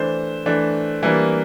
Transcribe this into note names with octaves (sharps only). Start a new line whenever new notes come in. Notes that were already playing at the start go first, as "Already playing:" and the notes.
Already playing: E3 A3 D4 C5
E3 A3 D4
E3 G3 A#3 D4